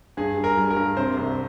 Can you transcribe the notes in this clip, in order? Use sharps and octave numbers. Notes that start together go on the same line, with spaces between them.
G2 G#4
G3
A#4
G3
A#4
G2
C3 C5
C2